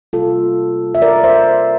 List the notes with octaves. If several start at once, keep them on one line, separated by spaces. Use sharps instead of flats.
C3 G3 A#3 F4 A4
E5
A#4 D5
C5 E5